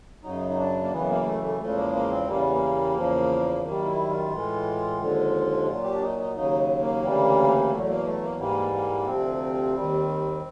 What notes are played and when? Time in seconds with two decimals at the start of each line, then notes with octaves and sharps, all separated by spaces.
0.23 F#2 C#3 F#3 D#4
0.49 D#4
0.57 D4
0.83 A#3
0.91 F#2 C#3 E3 B3
1.09 A#3
1.25 A3
1.42 A3
1.59 E2 C#3 F3 G#3 A3
1.76 A#3
1.93 A#3
2.11 C4
2.27 E2 C#3 E3 G3 A#3
2.40 B3
2.51 A#3
2.95 E2 C#3 F3
3.63 F#2 D#3 G3 A#3
3.86 E4
4.09 F4
4.30 A2 E3 G#3
4.99 D#2 D3 F3 G#3
5.67 A#2 F#3 F4
5.84 G4
5.94 D4
6.01 D#4
6.18 D#4
6.35 D#2 C#3 F#3 D#4
6.81 A#3
7.03 D2 C#3 E3 G3
7.70 E2 B2 F#3 A3
7.82 A3
7.88 A#3
8.05 A3
8.21 A#3
8.38 G#2 E3 G3 A#3
8.72 A#3
9.06 D2 C3 F3 C4
9.74 D#2 D#3 G3